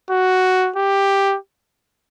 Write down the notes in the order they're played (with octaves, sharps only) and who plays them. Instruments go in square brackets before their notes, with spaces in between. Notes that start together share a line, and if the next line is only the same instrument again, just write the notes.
[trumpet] F#4
G4